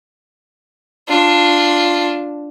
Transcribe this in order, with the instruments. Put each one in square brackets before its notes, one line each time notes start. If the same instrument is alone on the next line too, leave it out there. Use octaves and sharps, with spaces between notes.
[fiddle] D4 F4